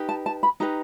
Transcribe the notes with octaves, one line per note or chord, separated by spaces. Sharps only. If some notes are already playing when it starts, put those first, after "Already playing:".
Already playing: D#4 G4 B4
A5
A5
B5
D#4 G4 B4 A#5